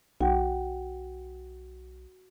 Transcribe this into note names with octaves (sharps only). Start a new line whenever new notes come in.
B1 F#4 F#5 G5